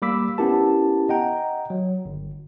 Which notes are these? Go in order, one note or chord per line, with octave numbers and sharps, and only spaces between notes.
G3 A#3 B5 D6 E6 B6
B3 C#4 E4 G4 A#4 A5
D#5 F#5 G5 A#5
F#3
G1